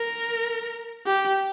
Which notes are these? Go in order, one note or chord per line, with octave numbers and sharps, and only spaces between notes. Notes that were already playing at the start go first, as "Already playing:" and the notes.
Already playing: A#4
G4